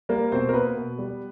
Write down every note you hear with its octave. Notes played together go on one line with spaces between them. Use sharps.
G3 A#3 A#4
B2 C4 C5
A#4
A#3 B3 B4
B2
G3